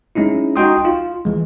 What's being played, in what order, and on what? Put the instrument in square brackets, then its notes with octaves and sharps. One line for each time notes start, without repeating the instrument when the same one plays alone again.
[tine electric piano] G#3 C#4 D#4 E4
D#4 F#4 D#5 G5 C6 D#6
F4
E3 G#3